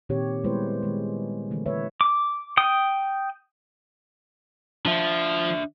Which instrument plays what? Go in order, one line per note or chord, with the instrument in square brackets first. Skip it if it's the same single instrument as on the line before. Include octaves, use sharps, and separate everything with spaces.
[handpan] A#2 D#3 C4 G4 C#5
G3 G#3 B3 E4 B4 C5
D#3 G#3
D3 E3 A3
B4 C#5 E5
[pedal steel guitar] D6
G5 D#6
[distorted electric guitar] F3 [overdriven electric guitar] D4 E5